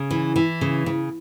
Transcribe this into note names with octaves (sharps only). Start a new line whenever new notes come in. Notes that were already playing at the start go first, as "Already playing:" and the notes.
Already playing: C#3
E3
E3
C#3
C#3